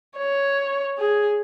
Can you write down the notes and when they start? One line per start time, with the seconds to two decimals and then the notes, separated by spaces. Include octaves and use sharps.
0.18 C#5
0.98 G#4